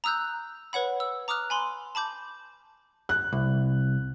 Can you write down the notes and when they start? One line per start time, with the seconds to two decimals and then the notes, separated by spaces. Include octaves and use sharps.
0.04 A#5 D#6 E6 F#6 G6
0.73 B4 C#5 F#5 B5
1.00 E6
1.28 A#5 D6 D#6 F6 F#6
1.50 G#5 B5 C6
1.95 A5 B5 D6 G6
3.09 F#6
3.33 C2